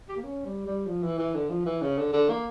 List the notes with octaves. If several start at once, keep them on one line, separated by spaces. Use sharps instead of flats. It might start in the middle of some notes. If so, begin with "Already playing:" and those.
G4
A#3
C#4
G3
G3
F3
E3
E3
D3
F3
E3
C#3
D3
D3
A#3